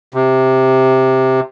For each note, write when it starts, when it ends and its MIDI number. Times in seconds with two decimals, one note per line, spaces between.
0.14 1.40 48